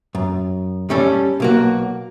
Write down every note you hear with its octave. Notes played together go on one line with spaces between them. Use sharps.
F#2
G3 C#4 A4
B1 A#3 F#4